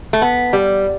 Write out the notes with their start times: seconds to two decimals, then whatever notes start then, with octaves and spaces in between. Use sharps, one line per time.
0.13 A3
0.22 B3
0.53 G3